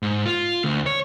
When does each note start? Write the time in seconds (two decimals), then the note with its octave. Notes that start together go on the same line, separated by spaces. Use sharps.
0.03 G#2
0.26 F4
0.64 D2
0.86 C#5